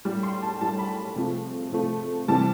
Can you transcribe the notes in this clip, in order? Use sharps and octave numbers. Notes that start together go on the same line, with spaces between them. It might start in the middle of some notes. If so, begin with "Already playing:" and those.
A2 G3
C6
A5
A2 G3 A5
B5
C3 F3 A3
C3 F3 A3
C3 E3 G3 A5